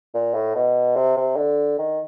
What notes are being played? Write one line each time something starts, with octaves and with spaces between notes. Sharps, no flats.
A#2
A2
B2
C3
C3
D3
D#3